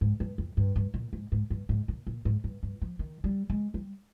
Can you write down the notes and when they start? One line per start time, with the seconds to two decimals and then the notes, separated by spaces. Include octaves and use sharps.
0.01 G#2
0.20 G2
0.38 F2
0.57 G2
0.76 G2
0.94 A#2
1.13 G#2
1.32 G#2
1.50 G2
1.69 G#2
1.88 A#2
2.07 A#2
2.25 G#2
2.44 G2
2.63 G2
2.82 F3
2.99 D#3
3.24 G3
3.50 G#3
3.74 G3